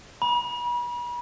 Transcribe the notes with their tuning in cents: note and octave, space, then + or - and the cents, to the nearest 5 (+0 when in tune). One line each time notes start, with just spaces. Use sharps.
B5 -40